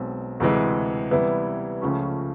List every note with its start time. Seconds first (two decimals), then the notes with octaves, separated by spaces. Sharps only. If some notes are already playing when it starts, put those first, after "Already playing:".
Already playing: B1 B2 G#3 C4
0.40 D2 C3 E3 G#3
1.11 C3 E3 G3 B3 E4
1.81 C#2 C#3 F3 A3 C#4